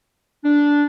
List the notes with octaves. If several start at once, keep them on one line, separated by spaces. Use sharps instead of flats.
D4